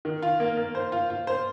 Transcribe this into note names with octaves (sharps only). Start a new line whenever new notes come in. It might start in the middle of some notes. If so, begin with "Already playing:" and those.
D#3
F4
A#3
A#3
C5
F4
F4
C5